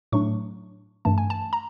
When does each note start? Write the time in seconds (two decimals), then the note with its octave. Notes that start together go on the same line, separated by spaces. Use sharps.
0.12 A2 F#3 A3 D4 C#6
1.05 G2 E3 A3 A5
1.18 G#5
1.30 A5
1.53 A#5